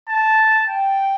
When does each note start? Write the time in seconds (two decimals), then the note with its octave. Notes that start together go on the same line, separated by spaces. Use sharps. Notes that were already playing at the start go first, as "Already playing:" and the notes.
0.09 A5
0.68 G5